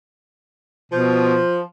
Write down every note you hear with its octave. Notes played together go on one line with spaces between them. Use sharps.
B2 F3